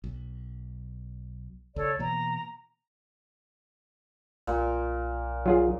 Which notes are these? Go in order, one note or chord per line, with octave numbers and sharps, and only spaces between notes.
B1
C#2 A4 C#5 D5
B2 E3 A#3 A#5
B1 A#2 A#4
F#3 F4 G#4